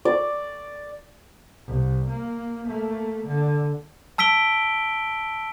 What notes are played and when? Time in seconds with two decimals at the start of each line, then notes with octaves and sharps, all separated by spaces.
0.05 D5
1.67 C2
2.08 A#3
2.67 A3 A#3
3.27 D3
4.18 A5 E6 B6 D7 G7